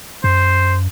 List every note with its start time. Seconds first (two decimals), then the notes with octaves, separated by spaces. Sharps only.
0.24 F#2 C5